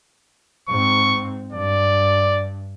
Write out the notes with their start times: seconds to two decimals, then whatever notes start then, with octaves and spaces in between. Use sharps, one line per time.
0.69 G#2 C4 C#6
1.52 G2 D5